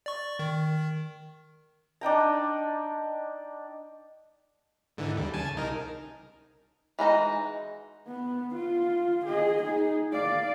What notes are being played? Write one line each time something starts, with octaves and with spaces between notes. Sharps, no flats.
D5 C#6
D#3
D4 D#4 G5 A#5
G#2 D3 E3
D#2 G3
C#3 G#5 A5
C2 D#4 A#4
E3 G#3 D#4 F#4
B3
F4
G#4 D#5
D#4 G#4
D5 F5